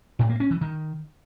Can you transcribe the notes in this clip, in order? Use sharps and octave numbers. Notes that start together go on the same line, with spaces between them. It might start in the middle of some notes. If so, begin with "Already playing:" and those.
A2
A#3
C#4
E3
D#3